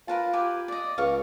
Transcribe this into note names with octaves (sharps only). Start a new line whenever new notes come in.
F4 A#4 B4 A5
G4 B4 G#5
D5 D#5
C#2 F5 C#6